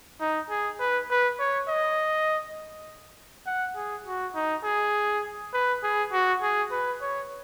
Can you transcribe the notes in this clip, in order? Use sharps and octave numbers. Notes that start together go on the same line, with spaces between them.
D#4
G#4
B4
B4
C#5
D#5
F#5
G#4
F#4
D#4
G#4
B4
G#4
F#4
G#4
B4
C#5